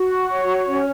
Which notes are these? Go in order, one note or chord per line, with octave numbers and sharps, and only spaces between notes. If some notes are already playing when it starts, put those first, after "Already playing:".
Already playing: F#4
C#5
C#4